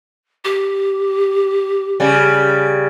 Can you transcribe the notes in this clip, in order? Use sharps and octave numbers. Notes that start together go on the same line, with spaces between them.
G4
C#3 G3